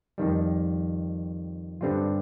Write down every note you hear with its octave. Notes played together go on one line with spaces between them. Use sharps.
F2 D#3 G3
G2 D3 G3 C4 F4